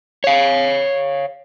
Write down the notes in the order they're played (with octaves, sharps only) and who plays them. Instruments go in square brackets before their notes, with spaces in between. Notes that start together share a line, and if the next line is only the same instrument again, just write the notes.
[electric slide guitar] C#5 F5